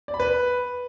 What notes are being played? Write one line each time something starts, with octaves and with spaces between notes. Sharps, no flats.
D5
B5
B4